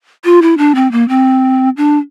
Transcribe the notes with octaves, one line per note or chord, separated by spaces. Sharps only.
F4
E4
D4
C4
A#3
C4
D4